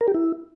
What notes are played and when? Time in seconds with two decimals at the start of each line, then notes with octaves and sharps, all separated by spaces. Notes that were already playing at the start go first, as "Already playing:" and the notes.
0.01 A#4
0.08 G4
0.14 E4